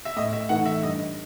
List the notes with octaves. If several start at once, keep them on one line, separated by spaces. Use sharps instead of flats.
E5
A2 D#5
E5
E3 A3 D#4 F#5
E5
G2 D#5